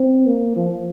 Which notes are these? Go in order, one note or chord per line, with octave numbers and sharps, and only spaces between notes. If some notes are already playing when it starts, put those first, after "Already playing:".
Already playing: C4
A#3
F3